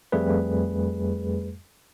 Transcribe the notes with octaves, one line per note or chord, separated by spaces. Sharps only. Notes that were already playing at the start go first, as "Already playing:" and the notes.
F2 G3 A3 G#4 B4